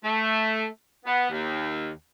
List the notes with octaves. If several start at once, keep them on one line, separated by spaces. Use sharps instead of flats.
A3
B3
D#2